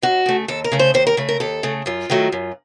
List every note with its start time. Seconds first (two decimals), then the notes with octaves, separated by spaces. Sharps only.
0.02 D#2 F#4
0.26 C#3 A3
0.48 D#2 A4
0.64 A#4
0.72 C#3 A3
0.79 C5
0.94 D#2 C5
1.07 A#4
1.17 C#3 A3
1.29 A#4
1.40 D#2 A4
1.63 C#3 A3
1.86 F#2 F4
2.10 D#3 F#3 A3
2.32 F#2